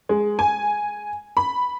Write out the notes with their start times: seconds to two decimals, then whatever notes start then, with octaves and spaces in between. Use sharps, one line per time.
0.09 G#3
0.39 G#5
1.37 B5